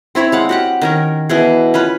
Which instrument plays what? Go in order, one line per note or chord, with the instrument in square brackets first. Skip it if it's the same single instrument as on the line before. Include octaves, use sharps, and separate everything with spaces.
[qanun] C4 E4 C#5 B5
G#3 F5 F#5
F#4 G4 F#5
D#3 C#4 A#4
B2 E3 G#4
C#4 F4 B4